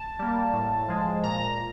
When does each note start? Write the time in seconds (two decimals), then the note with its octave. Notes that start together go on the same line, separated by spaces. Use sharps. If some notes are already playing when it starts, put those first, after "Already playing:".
Already playing: A5
0.19 G3 A#3
0.53 A2
0.88 F3 G#3
1.23 A#2 A#5